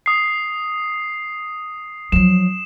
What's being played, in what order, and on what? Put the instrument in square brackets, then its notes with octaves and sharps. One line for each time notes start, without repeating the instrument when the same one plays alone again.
[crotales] D#6 C7
[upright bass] F3 F#3 [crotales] E7